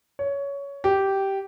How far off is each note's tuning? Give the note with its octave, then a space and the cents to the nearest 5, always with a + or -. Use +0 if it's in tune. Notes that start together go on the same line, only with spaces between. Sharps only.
C#5 +15
G4 -10